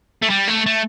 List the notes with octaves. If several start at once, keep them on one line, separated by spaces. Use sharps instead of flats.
A3
G3
A3
A3